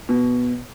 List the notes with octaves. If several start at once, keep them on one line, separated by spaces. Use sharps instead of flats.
B2